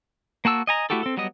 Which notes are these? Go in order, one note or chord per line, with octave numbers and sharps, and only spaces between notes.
A#3 F#4 A5 E6
D#5 G#5 A#5
A3 E4 F#4 G4 A4
C4 A4
F#3 G3 B3 D#5 D#6